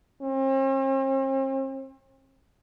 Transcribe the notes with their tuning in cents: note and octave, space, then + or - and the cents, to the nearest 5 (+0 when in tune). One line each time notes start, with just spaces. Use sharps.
C4 +45